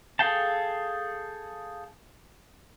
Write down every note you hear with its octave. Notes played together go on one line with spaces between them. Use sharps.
G#4 A4 F5 G5 A5